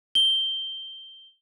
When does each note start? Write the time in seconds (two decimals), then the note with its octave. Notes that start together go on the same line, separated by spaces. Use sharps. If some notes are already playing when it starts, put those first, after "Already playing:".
0.15 G7